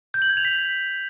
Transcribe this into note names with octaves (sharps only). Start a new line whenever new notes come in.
G6
F#7
G#6
F7
B6